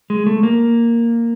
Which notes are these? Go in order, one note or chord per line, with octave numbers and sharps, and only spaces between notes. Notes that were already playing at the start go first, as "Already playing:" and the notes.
G#3
A3
A#3